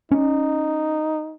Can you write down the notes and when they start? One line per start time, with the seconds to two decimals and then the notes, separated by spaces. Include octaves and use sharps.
0.11 C#4 D#4